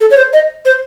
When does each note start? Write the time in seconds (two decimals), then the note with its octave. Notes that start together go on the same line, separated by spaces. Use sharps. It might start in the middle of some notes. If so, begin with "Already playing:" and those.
0.01 A4
0.11 C#5
0.17 C5
0.33 D#5
0.65 C5